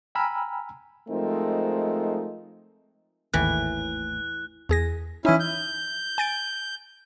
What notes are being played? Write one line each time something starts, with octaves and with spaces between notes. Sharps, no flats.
G5 G#5 A#5 B5 E6 F6
F3 G#3 A3 C4 D#4 A#4
G#1 D#2 A2 E3 F#6
E2 G#4 A#6
E3 C#4 D#4 E4
G6
G#5 A6 D7